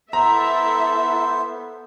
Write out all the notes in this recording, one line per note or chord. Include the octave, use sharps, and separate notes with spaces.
B3 E4 A4 C5 E5 A#5